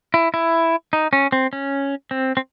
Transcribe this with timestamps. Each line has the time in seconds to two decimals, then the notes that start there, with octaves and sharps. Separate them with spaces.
0.14 E4
0.34 E4
0.93 D#4
1.13 C#4
1.32 C4
1.53 C#4
2.11 C4
2.37 C4